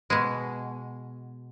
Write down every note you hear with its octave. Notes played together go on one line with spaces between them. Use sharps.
B2 G#3